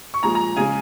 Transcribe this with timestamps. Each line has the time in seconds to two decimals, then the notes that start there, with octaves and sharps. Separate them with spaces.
0.14 C#6
0.23 A#2 F3 G#3 A#5
0.35 A#5
0.56 C#3 G#3 G#5